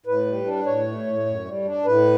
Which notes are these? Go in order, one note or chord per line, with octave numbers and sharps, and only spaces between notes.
A2 B4
G3
D4
A2 C#5
A3
A2
F#2
G3
D4
A2 B4